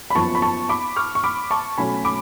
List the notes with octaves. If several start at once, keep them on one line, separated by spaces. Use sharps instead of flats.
B5
F#2 F3 B3 A5 C#6
B5
A5 C#6
B5 D6
C#6 F6
C#6
B5 D6
A5 C#6
B2 F#3 A3 C#4 G#5 B5
B5 D6